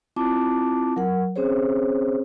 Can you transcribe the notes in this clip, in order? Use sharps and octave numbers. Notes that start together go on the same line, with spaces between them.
C4 E4 F4 A5 D6
F#3 A#4 F#5
C4 C#4 G#4 C5 C#5